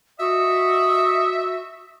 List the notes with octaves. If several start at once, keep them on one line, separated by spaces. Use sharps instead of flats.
F#4 D#5 E5